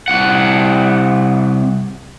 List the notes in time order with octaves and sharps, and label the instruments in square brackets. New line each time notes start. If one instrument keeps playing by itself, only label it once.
[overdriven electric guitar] C2 F#5